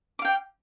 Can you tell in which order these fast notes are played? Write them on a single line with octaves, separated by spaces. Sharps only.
D6 F5 G5